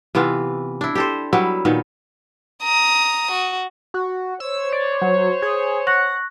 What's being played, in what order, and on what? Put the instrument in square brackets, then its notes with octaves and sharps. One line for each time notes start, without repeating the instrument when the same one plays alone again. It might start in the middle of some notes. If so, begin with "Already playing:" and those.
[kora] C3 E3 B3 F4
D4 E4
G4 A4 C5
F#3 G3 B3 E4
A#2 D#3 B3
[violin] A#5 D#6
F#4
[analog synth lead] F#4
[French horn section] C5 C#5 [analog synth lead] E6
[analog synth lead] D5
F#3
G#4
[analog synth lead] F#5 [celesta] C#6 F#6 A#6